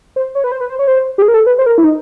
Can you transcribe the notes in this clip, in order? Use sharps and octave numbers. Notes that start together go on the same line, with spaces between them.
C5
C#5
B4
C5
B4
C5
C#5
C5
G4
G#4
A#4
A4
B4
C5
A#4
E4
D#4